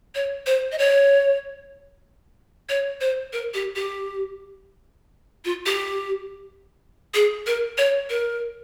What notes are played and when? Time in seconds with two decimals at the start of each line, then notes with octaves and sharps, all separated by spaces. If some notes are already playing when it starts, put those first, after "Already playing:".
0.15 C#5
0.46 C5
0.72 D#5
0.79 C#5
2.69 C#5
3.01 C5
3.33 A#4
3.54 G4
3.76 G4
5.45 F4
5.66 G4
7.14 G#4
7.46 A#4
7.78 C#5
8.10 A#4